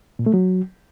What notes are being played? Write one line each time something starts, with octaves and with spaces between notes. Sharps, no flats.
A#2
A3
F#3